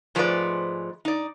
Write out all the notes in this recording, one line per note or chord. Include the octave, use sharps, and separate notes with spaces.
G#2 F3 G#3 A3 B4 D5
D#4 D5